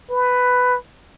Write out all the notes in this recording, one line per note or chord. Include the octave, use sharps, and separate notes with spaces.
B4